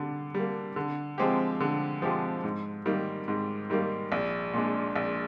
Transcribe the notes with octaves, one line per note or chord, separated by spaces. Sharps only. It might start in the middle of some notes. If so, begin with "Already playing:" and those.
Already playing: D3 G3
G3 A#3
D3
F3 G#3 C4 G4
D3
F3 G#3 C4 G4
G#2
D#3 G3 A#3
G#2
D#3 G3 A#3
A#1
A#2 G#3 D4
A#1